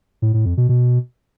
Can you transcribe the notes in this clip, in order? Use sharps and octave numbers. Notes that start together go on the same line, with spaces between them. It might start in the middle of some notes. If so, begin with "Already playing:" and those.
A2
A2
F2
B2
B2